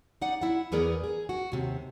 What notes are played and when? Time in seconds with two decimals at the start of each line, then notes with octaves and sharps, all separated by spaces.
0.21 D#4 D5 F#5
0.41 E4 F#5
0.72 E2 E3 B3 G#4 A#4 D5
1.04 G#4
1.29 F#4
1.52 D#2 C3